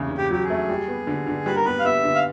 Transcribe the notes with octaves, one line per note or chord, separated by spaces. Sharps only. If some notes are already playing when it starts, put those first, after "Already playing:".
Already playing: E2 C#3 A3
C#3
G4
F#3 G4
G#4
A3
G3
B3
D3
D3
G3 B4
A#4
B3 B4
F5
B3 E5
D3
F5